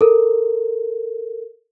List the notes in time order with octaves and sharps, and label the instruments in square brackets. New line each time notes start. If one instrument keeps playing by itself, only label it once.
[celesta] A4 A#4